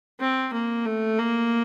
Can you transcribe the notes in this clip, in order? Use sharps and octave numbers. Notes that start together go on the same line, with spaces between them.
C4
A#3
A3
A#3